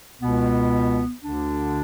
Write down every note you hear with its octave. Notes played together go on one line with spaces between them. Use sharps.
C#2 B2 B3
D2 D3 D4